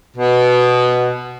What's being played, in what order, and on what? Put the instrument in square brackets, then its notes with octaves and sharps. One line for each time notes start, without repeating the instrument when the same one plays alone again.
[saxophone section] B2